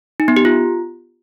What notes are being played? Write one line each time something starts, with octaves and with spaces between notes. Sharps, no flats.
D#4
B3
G4
F4